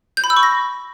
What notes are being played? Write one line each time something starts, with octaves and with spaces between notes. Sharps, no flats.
G6
B5
E6
C#6
A#6